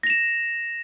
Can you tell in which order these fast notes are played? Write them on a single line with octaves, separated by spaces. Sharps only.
A#6 F7 E7